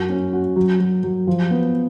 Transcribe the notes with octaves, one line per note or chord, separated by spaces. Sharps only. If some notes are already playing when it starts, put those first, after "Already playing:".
Already playing: F#2 F#4
C#4
F#4
F#3
F#3
F#3
F3
B3